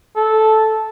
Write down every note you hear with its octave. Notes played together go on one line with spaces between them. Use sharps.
A4